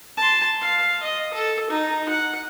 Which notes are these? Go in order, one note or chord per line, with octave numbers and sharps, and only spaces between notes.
A5 C6
F5
D#5
A4
D#4
F#5